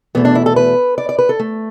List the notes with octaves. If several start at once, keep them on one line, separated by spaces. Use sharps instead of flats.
E2 B2 A3 B3
D4
E4
A4
B4
D5
D5
B4
A4
A3